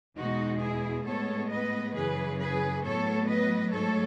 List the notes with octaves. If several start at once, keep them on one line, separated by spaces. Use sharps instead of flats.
E2 B2 G#3 D#4 F#4
E4 G#4
A2 G#3 B3 A4 C#5
B4 D#5
F#2 C#3 E3 G#4 B4
G#4 B4
A2 F#3 B3 A4 C#5
B4 D#5
G#2 F#3 A3 A4 C#5